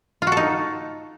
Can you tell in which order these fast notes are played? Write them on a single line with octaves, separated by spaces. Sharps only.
F4 F#4 A4 D#4